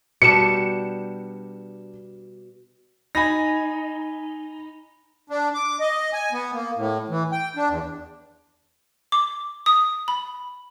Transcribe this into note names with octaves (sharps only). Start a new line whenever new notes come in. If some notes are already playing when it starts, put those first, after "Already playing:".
B2 G3 D4 C#7 E7
D#4 G#5 B5 A#6
D4
D6
D#5
G#5
B3
A#3
A2
E3
G5
D4
E2
D6
D#6
B5